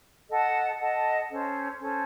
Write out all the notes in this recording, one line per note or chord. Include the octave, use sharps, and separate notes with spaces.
A4 D#5 F#5 A5
A4 D#5 F#5 A5
C#4 A4 C5
C#4 A4 C5